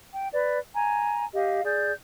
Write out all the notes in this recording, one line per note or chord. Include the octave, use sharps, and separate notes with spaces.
G5
B4 D5
G#5 A#5
G4 D#5 F5
G#4 D5 G6